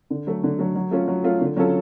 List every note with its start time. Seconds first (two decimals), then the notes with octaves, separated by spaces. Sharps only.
0.10 D3
0.27 F#3 A3
0.44 D3
0.59 F#3 A3
0.76 F#3
0.91 A3 C#4 F4
1.08 F#3
1.24 A3 C#4 F4
1.41 D3
1.57 F#3 C#4 F4 A4